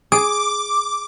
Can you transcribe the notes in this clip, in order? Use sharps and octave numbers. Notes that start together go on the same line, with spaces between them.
G#4 D6